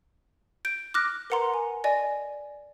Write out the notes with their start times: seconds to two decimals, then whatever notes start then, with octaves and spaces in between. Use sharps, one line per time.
0.65 G6 D7
0.94 D6 F6 F#6 A#6
1.30 A#4 B4 F#5 A#5 C6
1.54 G#5
1.84 D5 D#5 G#5